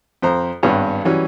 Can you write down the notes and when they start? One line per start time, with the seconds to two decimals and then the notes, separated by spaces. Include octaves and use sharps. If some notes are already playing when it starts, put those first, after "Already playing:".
0.22 F2 C5 A#5
0.63 G#1 G2 B3 C#5
1.05 E3 F#3 G3 C#4